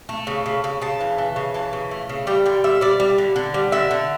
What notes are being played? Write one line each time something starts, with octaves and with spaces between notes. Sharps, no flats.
A3
C#3
C#3
C#3
C#3 A5
E3
E3
C#3
E3 A5
C#3
A3
C#3
G3 G5
D3 G5
G3 E5
G3 D5
G3
D3
D3
G3
D3 E5
D3